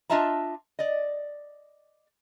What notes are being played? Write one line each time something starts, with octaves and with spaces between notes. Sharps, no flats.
D4 F4 D#5 E5 A5 A#5
D5 D#5